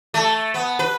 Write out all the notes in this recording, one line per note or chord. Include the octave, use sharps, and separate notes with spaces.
A3
B3
B4